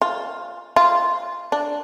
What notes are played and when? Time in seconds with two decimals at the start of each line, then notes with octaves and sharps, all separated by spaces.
0.01 F4
0.76 F4
1.52 D4